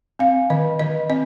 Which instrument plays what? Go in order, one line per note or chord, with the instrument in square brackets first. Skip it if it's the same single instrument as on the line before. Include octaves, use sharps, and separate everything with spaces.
[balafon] C4 F5
D#3 D#5
D#3 D#5
C4 D#5